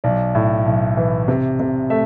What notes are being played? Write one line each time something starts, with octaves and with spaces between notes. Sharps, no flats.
B1 D5
A2
B1
E3
C3
C3
A3 E5